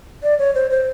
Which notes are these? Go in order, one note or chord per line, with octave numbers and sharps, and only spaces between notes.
D5
C#5
C5
C5